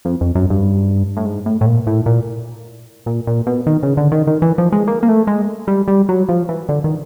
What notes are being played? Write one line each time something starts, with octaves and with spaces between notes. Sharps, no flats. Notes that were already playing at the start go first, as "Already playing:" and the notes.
F2
F2
F#2
G2
A2
G#2
A2
A2
A#2
A2
A#2
A#2
A#2
B2
D#3
C#3
D3
D#3
D#3
E3
F3
G#3
A#3
A#3
A3
G#3
G3
G3
F#3
F3
E3
D3
D#3